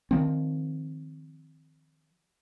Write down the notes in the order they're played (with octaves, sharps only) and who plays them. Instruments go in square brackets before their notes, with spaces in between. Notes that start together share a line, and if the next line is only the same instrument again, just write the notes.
[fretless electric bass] D#3 F3 C4